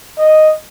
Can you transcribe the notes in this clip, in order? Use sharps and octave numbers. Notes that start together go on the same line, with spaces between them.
D#5